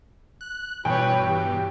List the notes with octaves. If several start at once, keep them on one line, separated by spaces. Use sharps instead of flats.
F#6
G2 B2 E3 B4 C#5 G5
G4